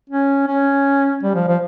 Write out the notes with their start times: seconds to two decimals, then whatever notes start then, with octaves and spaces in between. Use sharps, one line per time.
0.10 C#4
0.47 C#4
1.23 G3
1.35 F3
1.48 F3